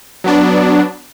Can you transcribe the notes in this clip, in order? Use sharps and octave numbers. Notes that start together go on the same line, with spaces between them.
F#3 B3 D4